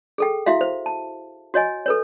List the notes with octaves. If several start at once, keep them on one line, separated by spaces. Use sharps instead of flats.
G#4 A4 G5
E4 F#4 E5 F5
C5
A5
F#4 C#5 D#5 G#5
A4 B4 C#5